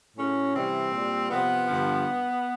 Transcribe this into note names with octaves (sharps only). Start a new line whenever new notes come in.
A2 F#3 C#4
C3 E3 G3 C4
A#2 G3
C3 F3 B3
G2 D3 F3